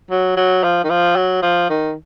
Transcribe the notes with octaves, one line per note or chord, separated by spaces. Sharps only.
F#3
F#3
F3
D#3
F3
F#3
F3
D#3